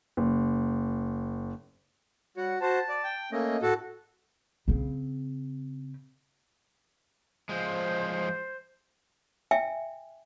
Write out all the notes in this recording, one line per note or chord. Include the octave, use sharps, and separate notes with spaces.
F#1
G3 F#4 C#5 F#5
F#4 C5 A5
D5
G5
A3 A#3 C#4 D#5
A2 F#4 A4
C#3 C4
F3 G#3 C5
E5 G5 G#5